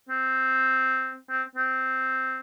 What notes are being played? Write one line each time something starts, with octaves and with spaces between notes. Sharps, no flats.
C4
C4
C4